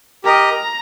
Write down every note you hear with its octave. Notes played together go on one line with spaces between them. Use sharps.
G4 A#4 D#5 A#5